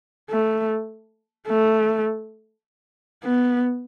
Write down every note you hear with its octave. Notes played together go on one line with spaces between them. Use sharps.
A3
A3
B3